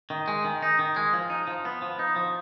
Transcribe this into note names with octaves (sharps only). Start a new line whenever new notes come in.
D#3
G#3
D#3
D#4
D#3
G#3
F3
D#4
F3
B3
F3
D#4
F3